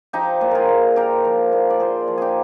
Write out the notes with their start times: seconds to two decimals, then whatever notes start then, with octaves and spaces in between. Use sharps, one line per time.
0.13 F3 D#4 G4
0.41 A#2
0.51 F4 G#4 A#4
0.69 A#2
0.96 F3 G4 A#4
1.25 F3
1.52 A#2
1.70 D5
1.80 A#2 G#4 C5
2.08 F3
2.18 D#4 G4 G#4